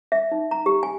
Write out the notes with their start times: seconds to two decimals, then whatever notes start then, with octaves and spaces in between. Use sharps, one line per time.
0.12 E5
0.32 D#4
0.51 A#5
0.66 G4
0.83 G#5